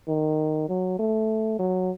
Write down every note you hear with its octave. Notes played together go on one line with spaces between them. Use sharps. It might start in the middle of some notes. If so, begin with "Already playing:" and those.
D#3
F#3
A3
F#3